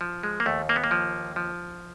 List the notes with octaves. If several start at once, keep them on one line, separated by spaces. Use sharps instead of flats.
F3
G#3
A#3
D#2 A3
A#3
B3
A#3
F3
F3